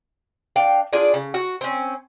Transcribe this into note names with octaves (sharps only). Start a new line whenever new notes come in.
D4 F5 G5
D4 F4 G#4 D5
C#3
F#4
C4 C#4